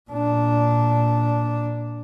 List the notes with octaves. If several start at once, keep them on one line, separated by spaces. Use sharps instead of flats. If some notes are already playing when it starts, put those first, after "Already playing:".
A#2 D4